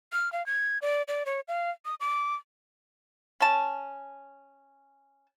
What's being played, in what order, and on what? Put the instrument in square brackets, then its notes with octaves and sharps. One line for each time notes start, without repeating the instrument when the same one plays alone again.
[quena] F6
F5
G#6
D5
D5
C#5
F5
D#6
D6
[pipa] C#4 A5